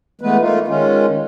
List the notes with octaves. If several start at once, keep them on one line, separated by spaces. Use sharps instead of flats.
E3 G#3 A3 B3 B4
A3 A#3 D#4 F4
D#3 G#3 C#4 F4